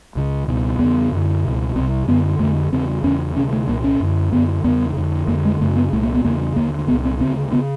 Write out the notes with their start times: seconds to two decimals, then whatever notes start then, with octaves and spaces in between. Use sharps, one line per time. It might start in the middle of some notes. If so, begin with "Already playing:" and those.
0.16 C#2 C#3
0.48 C#2 B2
0.79 E2 C#3 B3
1.12 F#2 D3
1.44 C#2 B2
1.75 C2 C4
1.80 C3
2.07 F#2 D3 B3
2.39 F2 D3 A3
2.72 E2 C#3 C4
3.03 E2 C#3 C#4
3.36 C3 C#4
3.39 D2
3.52 A3
3.68 C2 A#2 A#3
3.84 C#4
4.00 F#2 D3
4.32 F#2 D3 B3
4.64 E2 C#3 B3
4.97 F2 D3
5.28 F2 D3 A#3
5.45 G#3
5.60 F#2 C#3 A3
5.76 B3
5.93 C2 A#2 A3
6.03 A#3
6.14 B3
6.24 E2 C#3 A#3
6.56 D#2 D3 A#3
6.88 C2 A#2 B3
7.05 C4
7.21 D2 C#3 C4
7.52 C#3 B3